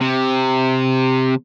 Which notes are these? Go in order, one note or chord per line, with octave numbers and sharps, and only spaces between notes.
C3